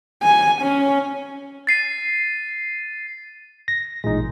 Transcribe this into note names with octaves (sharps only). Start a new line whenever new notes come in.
G#5
C#4
A6 C7 D#7
A#6
A1 A#2 G#3 D#4